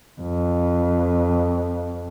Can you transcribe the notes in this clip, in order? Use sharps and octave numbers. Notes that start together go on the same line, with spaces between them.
F2